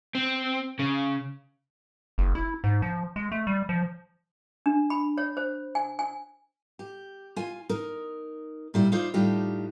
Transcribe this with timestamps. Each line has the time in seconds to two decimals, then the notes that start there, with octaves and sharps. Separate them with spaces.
0.15 C4
0.79 C#3
2.18 F#1
2.35 E4
2.64 G#2
2.82 F3
3.16 G#3
3.32 A3
3.47 G3
3.69 F3
4.66 D4
4.90 B5
5.18 C#5
5.37 C5
5.75 G#5
5.99 G#5
6.79 G4
7.36 F4 G#5
7.69 D#4 A#4
8.74 A#2 G3 E4
8.92 D#4 F4 C5 D5
9.14 A2 G3 D4 D#4 F4 G4